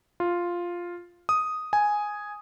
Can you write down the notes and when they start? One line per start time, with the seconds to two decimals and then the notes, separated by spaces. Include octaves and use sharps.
0.20 F4
1.29 D#6
1.73 G#5